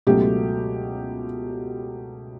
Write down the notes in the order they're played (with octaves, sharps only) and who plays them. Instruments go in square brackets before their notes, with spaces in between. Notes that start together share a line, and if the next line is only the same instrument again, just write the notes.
[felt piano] C#2 B2 F#3 A3 G4